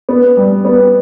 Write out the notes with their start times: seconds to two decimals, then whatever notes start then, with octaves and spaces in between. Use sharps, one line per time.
0.09 B3
0.37 G3
0.65 B3